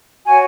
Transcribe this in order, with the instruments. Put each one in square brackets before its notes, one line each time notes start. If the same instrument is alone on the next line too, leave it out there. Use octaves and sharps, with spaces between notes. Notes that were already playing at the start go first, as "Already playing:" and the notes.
[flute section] F#4 C#5 G#5